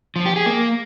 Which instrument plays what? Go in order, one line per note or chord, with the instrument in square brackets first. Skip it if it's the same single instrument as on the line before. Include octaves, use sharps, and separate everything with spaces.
[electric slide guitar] F3
G4
G#4
A#3